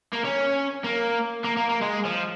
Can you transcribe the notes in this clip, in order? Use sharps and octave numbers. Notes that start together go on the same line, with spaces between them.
A#3
C#4
A#3
A#3
A#3
A#3
G#3
F3